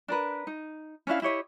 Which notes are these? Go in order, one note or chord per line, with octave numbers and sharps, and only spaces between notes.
D4 A#4 B4
D#4
C#4 D4 E4 F5
E4 G4 C#5 D#5